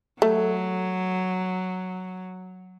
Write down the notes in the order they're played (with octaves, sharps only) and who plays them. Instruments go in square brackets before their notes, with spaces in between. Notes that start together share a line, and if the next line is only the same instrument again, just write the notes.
[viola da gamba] F#3 [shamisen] A3